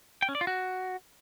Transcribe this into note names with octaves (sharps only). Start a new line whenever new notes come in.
G5
C#4
D5
F4
F#4